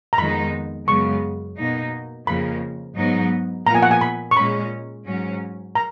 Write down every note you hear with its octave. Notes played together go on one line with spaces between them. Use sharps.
A#5
F2 D#3 G#3 B3 D#4 B5
F#2 C#3 G#3 B3 C#6
B2 A#3 D#4
F2 C#3 F3 A#3 B5
G#2 F#3 B3 D#4
A#2 F3 B3 A#5
G#5
F#5
G#5
B5
C#6
A#2 G#3 C#4 B5
G#2 F#3 C#4
A#5